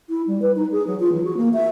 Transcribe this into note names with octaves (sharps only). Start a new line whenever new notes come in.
E4
G3
B4
D#4
G#4
F#3
F4
E3
F#4
A#3
E5